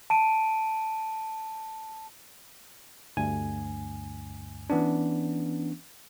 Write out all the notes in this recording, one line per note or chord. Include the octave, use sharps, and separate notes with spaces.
A5 D7 D#7
D2 G2 G#5
E3 B3 C#4 D4